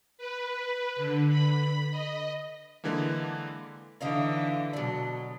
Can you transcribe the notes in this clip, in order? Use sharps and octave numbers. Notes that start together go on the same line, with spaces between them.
B4
D3
B5
D#5
D3 E3 G#3 A#3
D3 E3 D#4 D#5 F5
B2 F#3 D4